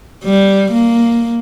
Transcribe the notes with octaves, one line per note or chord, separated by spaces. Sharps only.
G3
A#3